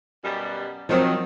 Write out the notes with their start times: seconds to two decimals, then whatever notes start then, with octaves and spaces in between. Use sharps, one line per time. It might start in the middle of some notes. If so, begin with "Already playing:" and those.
0.24 F#2 B2 G3
0.89 D#3 F3 F#3 C4